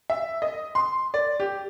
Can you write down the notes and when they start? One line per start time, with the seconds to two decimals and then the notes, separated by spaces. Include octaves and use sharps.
0.10 E5
0.42 D#5
0.75 C6
1.14 D5
1.40 G4